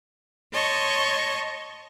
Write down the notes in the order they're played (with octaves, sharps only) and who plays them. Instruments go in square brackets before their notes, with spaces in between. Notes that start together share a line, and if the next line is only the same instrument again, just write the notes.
[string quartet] C#5 D#5 A5 C6 C#6